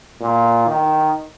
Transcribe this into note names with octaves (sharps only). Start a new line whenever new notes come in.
A#2
D#3